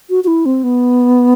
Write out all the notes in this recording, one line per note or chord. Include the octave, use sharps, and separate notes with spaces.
F#4
F#4
E4
C4
B3